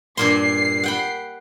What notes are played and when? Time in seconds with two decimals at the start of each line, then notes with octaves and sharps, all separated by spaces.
0.17 G2 A#2 C6 C7
0.83 F#5 G5 B5